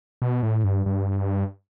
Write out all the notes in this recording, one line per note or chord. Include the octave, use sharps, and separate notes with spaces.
B2
A2
G2
G2